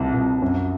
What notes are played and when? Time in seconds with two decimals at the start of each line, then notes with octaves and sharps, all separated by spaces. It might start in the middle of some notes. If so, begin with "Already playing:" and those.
Already playing: C2 A5
0.14 C2
0.42 F#2